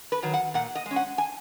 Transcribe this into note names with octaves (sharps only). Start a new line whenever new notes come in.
B4
D#3 F#3
F#5
A#2 F#5
D#5
G#3
C#4
F#5
G#5